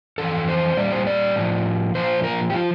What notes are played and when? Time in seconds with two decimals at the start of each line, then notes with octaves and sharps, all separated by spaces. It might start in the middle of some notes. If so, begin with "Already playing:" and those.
0.18 F2 E3 A4
0.49 C5
0.77 A#2 G3 D5
0.92 C5
1.07 D5
1.36 A2 F3
1.95 A#2 F3 C5
2.24 A#4
2.50 G4
2.54 F3 F4